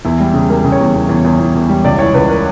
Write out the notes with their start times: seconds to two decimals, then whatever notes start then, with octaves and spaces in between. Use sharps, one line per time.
0.05 E2 E4
0.20 G3
0.34 C#3
0.50 G3 A#4
0.65 C#3
0.72 C#5
0.80 E2
0.95 E2
1.09 E2
1.25 E2
1.39 E2
1.55 E2
1.69 G3
1.85 C#2 D5
1.99 E3 C#5
2.14 C#2 B4
2.30 A#4